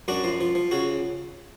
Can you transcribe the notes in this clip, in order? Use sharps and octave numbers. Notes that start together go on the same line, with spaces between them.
F#2 D4 F#4
F3
F3
F3
C#3 F#4